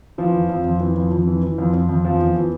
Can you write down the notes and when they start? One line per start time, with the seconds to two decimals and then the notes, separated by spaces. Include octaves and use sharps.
0.18 E3 F3
0.34 F2
0.49 F2
0.64 F2
0.81 E3
0.97 F2
1.11 F2
1.27 E3
1.43 E3
1.58 F2
1.73 F2
1.89 F2
2.05 E2 F3
2.20 E2
2.35 E3